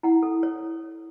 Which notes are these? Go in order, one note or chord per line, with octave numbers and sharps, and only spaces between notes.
E4 F#5
A4
C#5